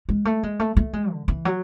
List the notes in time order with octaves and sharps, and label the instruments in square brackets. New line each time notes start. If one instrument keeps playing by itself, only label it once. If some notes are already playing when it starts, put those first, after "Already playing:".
[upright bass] G#3
A3
G#3
A3
A3
G#3
D3
E3
F#3